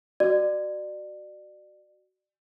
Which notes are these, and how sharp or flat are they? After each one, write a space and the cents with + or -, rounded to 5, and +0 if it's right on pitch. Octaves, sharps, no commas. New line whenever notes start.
F#4 +15 D5 +30